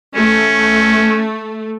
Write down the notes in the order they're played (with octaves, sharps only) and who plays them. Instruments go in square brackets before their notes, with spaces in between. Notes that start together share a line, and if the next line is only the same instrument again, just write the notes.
[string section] A3 [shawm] C#4